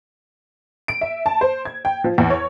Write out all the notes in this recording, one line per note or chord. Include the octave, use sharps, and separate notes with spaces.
D7
E5
A5
C5
G#6
G5
F3
E2
C#5